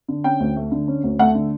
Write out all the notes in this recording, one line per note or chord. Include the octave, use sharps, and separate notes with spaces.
D3
C#4 G5
D2
A3
D3
C#4
D2
A3 F#5
D3